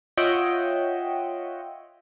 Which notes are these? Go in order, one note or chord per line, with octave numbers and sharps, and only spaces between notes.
F4 C#5 D#5 E5 F#5 G5